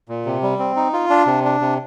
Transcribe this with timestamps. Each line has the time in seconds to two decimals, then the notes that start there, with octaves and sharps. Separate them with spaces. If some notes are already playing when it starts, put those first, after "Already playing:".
0.09 A#2
0.25 C3
0.43 G3
0.59 C4
0.76 D#4
0.93 F4
1.10 D4
1.27 C3
1.44 D4
1.61 C3